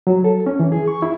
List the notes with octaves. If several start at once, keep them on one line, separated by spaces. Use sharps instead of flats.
F#3
A4
C#4
E3
G#4
C#6
E4